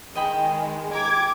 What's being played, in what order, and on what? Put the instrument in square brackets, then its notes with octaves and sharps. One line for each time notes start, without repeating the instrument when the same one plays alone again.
[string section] D#3 G#3 [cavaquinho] D#5 G5 B5
[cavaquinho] G4 A#5 [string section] D6 G#6